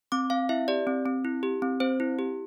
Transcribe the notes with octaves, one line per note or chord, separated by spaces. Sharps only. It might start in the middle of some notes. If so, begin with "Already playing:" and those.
C4 D6
C4 F5
E4 E5
G4 D5
C4
C4
E4
G4
C4
C4 C5
E4
G4